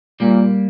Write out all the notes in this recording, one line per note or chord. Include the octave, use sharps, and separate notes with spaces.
A#2 G3 A#3